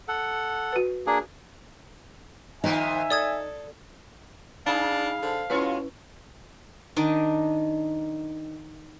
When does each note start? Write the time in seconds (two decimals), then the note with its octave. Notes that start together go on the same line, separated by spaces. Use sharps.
0.08 A4 F#5
0.73 F#4 B4
1.07 A#3 D4 G#4
2.64 D#3 F3 B3 D#4 E5 G#5
3.10 A4 D5 D#6 G#6
4.66 D4 D#4 G#4 F5
5.22 D3 C5 A5
5.50 B2 G#3 C#4 E4 F4 B4 C#5
6.96 D#3 D4 D#4